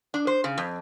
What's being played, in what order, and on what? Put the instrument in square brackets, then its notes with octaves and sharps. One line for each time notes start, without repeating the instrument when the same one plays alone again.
[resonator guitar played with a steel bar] D4
C5
C#3
F2